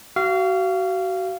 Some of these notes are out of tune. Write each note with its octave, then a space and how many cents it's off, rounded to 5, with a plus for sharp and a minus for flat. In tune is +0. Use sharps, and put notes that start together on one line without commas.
F#4 +30 F5 -20